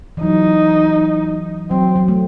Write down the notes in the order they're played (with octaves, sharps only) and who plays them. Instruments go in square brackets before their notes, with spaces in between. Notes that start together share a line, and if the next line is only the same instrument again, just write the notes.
[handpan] E3
[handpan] F#3 [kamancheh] D#4
[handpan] F#3 [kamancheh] C4
[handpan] F#3
A3